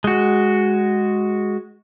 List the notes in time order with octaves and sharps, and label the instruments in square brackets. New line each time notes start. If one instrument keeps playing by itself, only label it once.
[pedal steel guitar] G#3 F#4